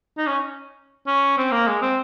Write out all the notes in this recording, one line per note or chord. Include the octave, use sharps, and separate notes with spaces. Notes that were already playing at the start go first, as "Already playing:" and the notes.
D#4
C#4
C#4
C4
A#3
G#3
C4